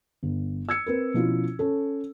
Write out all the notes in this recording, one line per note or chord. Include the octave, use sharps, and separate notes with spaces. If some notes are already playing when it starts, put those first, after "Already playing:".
G1
E6 G#6 C#7
C4 A#4 B4
B2 F3 C#4 E4 F4
C#4 A4